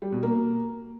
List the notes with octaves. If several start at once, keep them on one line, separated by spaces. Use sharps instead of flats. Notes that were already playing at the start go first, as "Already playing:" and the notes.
G3
B2
A#3